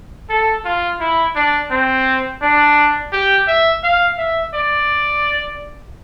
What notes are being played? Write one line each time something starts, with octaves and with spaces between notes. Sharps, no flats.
A4
F4
E4
D4
C4
D4
G4
E5
F5
E5
D5